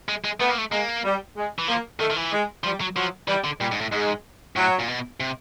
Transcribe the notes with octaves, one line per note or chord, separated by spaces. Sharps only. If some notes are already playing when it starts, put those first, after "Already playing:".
G#3
G#3
A3 B3
A#3
A3
G#3 A#3
G3
G#3
E3
F3 A#3
D#3 A3
D#3
E3
G#3
F3 G3
F#3
F3 F#3
E3 G3
D3
A#2 G3
G#2
A2
G#2 G#3
A2 F#3
A#2
B2
C3